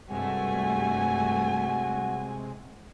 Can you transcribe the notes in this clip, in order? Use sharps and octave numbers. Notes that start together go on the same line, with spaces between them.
G2 C3 G#3 A3 F#4 G#5